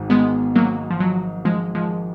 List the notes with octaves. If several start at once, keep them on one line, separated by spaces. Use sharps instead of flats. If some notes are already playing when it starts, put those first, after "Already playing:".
Already playing: G#1 G#2 D#3
G#3 B3
F#3 A#3
F3
F#3
F3 G#3
F3 G#3